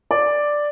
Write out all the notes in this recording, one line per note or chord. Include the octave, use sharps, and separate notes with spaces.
D5